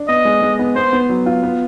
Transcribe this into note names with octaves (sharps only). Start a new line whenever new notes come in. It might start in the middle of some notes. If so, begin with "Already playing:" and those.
Already playing: D4
B3 D#5
G#3
G#3
B3
B3 C5
B3
F#3
F4
B3